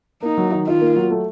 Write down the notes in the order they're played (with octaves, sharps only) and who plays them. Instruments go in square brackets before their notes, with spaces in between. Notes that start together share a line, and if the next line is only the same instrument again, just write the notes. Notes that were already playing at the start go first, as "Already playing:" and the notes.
[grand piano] A#3 [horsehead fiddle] D#4
[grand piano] F#3
D#3
[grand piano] D#3 [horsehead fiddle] F4
[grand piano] A#3
F#3
A3